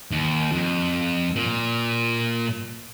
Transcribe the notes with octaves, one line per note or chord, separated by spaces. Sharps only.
D#2
F2
A#2